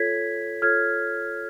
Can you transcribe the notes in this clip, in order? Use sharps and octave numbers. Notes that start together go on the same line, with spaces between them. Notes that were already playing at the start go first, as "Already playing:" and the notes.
Already playing: F4 A4 C#5 G#6 B6
F4 A4 C#5 F6 G#6